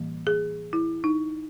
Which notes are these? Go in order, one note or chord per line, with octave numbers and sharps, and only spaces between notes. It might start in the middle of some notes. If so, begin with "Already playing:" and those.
Already playing: A2 E3 G3 A#3
G#4
E4
D#4